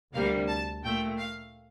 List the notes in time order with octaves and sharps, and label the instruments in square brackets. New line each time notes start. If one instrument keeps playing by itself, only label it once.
[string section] D2 C3 G3 A#3 F5
A5
A#2 A3 G5
F5